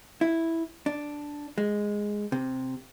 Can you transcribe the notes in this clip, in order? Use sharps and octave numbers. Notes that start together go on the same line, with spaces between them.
E4
D4
G#3
C3